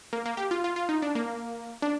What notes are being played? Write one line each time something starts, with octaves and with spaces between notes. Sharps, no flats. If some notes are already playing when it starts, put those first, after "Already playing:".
A#3
A#3
G4
F4
F4
F4
D#4
D4
A#3
D4